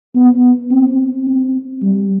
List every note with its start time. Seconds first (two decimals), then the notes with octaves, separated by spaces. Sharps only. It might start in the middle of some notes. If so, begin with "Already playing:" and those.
0.15 B3
0.71 C4
1.27 C4
1.82 G3